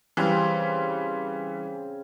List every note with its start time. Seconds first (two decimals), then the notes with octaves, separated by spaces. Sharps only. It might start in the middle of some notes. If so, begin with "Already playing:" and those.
0.17 C#3 E3 G3 C4 C#4